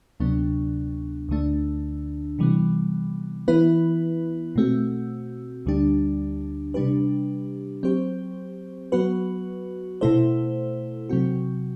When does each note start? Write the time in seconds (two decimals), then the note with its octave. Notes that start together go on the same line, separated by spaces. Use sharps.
0.20 D2 C3 F#3 B3 D4
1.29 D2 D3 A3 D4
2.39 C3 E3 G3 B3
3.48 E3 B3 E4 B4
4.56 B2 A3 C4 F#4
5.66 D2 D3 G3 D4 G4
6.74 C3 G3 D4 G4 B4
7.83 F#3 C4 G4 C5
8.92 F#3 B3 F#4 B4
10.01 B2 A3 E4 A4 C5
11.09 C3 F#3 C4 F#4